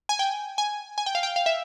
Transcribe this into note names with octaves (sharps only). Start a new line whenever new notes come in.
G#5
G5
G#5
G#5
G5
F5
G5
F5
E5